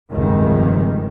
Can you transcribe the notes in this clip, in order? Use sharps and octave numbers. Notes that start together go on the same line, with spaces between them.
F1 C#2 G2 C3 D#3